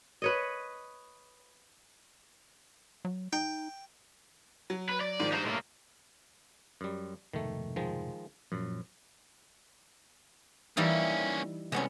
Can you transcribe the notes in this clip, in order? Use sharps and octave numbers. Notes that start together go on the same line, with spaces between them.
B4 C#5 D#5
F#3
D#4 G5
F#3
B4
D5
G#2 D#3 F3
G2 D#4 C5
A2 A#3
F#2 G3
F1 G#2 B2 D#3 A3
D#3 F3 G#3
F#2 A#2 F3
E3 G3 A#3 C#4 D#4
C2 G#3 B3 C#4